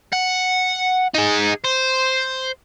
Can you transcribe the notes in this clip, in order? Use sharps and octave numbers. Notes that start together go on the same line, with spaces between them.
F#5
D#4 G#4
C5